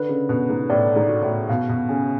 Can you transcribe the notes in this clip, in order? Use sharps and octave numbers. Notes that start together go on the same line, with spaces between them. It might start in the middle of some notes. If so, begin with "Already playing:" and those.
Already playing: D3 B4
C#3
B2 B4
G#2
A2 D5
G#2
F#4
A2
B2 F5
B2
C#3 G#5